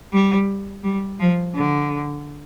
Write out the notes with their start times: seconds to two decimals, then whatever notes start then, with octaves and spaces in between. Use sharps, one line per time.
0.13 G3
0.84 G3
1.20 F3
1.55 D3